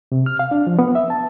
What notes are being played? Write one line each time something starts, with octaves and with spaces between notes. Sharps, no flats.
C3
F6
F5
D4
F3
B3
E5
A5